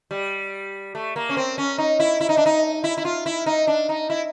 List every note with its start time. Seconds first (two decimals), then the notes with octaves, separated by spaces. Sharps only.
0.11 G3
0.95 A3
1.16 A#3
1.29 C#4
1.37 C4
1.58 C#4
1.78 D#4
2.00 E4
2.21 E4
2.29 D#4
2.37 D4
2.46 D#4
2.84 E4
2.98 E4
3.05 F4
3.26 E4
3.46 D#4
3.67 D4
3.89 D#4
4.10 E4